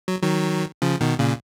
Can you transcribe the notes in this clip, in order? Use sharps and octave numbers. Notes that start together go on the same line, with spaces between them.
F#3
D#3 F#3
C#3 F3
B2 D#3
A#2 C#3